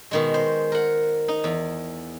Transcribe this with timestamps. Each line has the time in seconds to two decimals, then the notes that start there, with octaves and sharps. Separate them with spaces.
0.11 B2 D#3 G#3
0.34 C5
0.72 A#4 F#5
1.28 D#4
1.44 E2